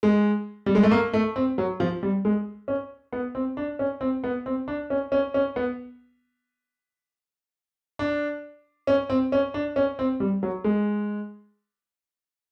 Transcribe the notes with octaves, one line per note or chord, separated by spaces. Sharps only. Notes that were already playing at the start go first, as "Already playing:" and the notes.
G#3
G3
G#3
A3
A#3
A3
C4
F#3
F3
G3
G#3
C#4
B3
C4
D4
C#4
C4
B3
C4
D4
C#4
C#4
C#4
B3
D4
C#4
C4
C#4
D4
C#4
C4
G3
F#3
G#3